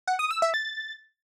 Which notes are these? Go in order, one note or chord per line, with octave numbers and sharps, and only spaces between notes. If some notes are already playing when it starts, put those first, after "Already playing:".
F#5
D#6
E6
E5
A6